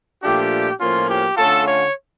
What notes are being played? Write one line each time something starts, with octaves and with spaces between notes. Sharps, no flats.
A#2 F3 A3 D4 F4 G4
A2 F3 A#3 C#4 F4
G4
D3 A3 C#4 F4 A4
C#5